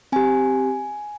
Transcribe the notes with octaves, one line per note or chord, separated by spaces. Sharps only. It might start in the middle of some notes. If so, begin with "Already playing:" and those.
C4 G4 G#5